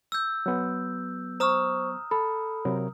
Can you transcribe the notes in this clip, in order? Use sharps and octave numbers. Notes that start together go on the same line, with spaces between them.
E6 G6
F#3 B3
C5 A#5 C#6 D#6 F6
A4 B5
C3 F#3 A#4